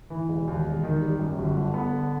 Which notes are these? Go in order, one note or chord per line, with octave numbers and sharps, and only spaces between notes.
E3
E1
D#2
E1
D#3
G3
F#2
G1
D3
B3
D3